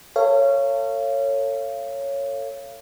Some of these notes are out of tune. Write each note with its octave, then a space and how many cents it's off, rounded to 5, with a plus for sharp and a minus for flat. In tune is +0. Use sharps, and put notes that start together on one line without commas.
A4 +40 C#5 +0 F5 -30